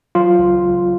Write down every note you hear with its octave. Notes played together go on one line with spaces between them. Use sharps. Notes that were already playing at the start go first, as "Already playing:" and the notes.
F#3 F4
C#2
C#2